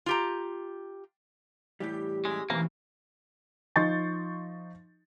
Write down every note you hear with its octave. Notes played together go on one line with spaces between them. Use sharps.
F4 G4 A#5
A2 E3 G3 G4
F2 G#3 C#4 E4
B1 A2 E3 A#3 C4 C#4
F3 D#4 C6 C#6 G6 A6